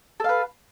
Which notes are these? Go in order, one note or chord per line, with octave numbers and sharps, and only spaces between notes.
A4 B4 F5